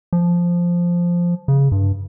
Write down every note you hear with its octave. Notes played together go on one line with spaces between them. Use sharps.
F3
C#3
G2